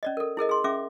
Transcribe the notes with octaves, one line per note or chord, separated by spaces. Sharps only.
C#4 D5 D#5
A4 A#4
E4 G#4 A#4 D#5
G#4 C6
C#4 G#4 E5 D6